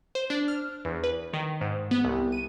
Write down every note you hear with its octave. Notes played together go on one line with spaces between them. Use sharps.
C5
D4
F6
E2
B4
D#3
G#2
B3
C2
D#7